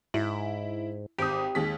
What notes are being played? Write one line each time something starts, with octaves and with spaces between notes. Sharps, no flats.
G#2 E4
G#1 G4 D#6
D#2 G#3 B6